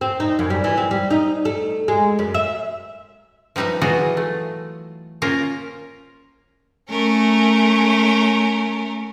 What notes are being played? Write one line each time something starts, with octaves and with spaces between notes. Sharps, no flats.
C4
D#4
F#2
G3
E3
C4
G3
D#4
A3
G#3
F#2
E5
F3 G3 D#4 B4 E5
E3 F#3 F4 F#4 G#4 D#5
A3
A#3 C#4 F4 A#4 C5
A3 C#4 A#4